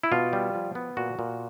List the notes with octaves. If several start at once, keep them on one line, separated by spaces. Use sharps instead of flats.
E4
B2 F4
G3
F3
B3
A#2 F#4
A#2